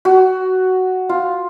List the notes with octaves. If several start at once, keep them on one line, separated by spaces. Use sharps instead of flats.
F#4
F4